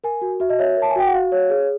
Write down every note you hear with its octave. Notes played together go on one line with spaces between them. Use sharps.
A#4 G#5
F#4
F#4 E5
D#5
C#5 E5
A#4
A5
G#5
F#4 G5
F#5
F#4 F5
C#5
G#4